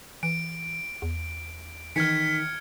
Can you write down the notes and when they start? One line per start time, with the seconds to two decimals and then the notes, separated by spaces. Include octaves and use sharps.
0.23 E3 D7
1.02 E2
1.96 D#3 E3 F6 G#6 B6 C#7